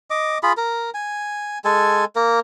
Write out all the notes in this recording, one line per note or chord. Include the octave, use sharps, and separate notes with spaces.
D#5 D6
F4 G#4 B5
A#4
G#5
G#3 A4 G#5
A#3 A#4